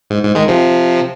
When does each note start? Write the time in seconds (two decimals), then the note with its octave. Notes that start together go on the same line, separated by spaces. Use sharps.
0.10 G#2
0.23 G#2
0.35 D#3 G#3
0.48 C3 F3